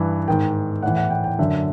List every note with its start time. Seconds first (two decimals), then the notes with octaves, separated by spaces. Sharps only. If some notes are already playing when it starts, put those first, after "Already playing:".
Already playing: G2 E3
0.28 G#2 D#3 G5
0.83 A2 E3 F#5
0.97 F#5
1.10 G5
1.24 G5
1.39 F#2 D3 E5